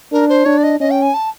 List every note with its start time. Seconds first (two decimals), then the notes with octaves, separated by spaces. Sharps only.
0.12 D4 A#4
0.29 C5
0.45 D4 C#5
0.58 D5
0.63 D#5
0.80 C#4 D#5
0.91 G5
1.02 G#5
1.14 A5